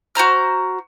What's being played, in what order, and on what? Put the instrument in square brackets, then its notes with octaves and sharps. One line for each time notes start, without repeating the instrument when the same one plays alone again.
[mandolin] F#4 C5 A#5 F6